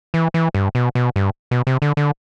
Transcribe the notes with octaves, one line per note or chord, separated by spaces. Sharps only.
E3
E3
G2
B2
B2
G2
B2
C3
D3
D3